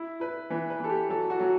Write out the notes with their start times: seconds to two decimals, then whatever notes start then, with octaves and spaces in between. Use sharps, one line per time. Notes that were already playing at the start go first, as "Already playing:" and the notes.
Already playing: E4
0.20 E4 B4
0.50 E3 B4
0.70 B4
0.79 E3 A4
0.90 G4
1.09 F#3 A4
1.30 F#4
1.40 F#3